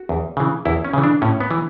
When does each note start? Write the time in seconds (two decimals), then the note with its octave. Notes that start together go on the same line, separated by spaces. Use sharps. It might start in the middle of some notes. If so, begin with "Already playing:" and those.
Already playing: F#4
0.09 E2
0.37 C#3 E3
0.65 E2 E4
0.85 C#4
0.93 C#3 E3
1.04 D4
1.22 A2 C#4
1.41 B3
1.51 E3